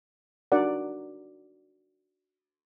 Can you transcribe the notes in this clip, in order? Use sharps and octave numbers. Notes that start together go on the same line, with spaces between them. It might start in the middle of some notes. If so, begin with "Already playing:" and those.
D4 D#4 F#4 A#4 D5 F#5